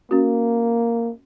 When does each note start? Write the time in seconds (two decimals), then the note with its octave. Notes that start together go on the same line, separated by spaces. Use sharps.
0.11 A#3 C#4 F#4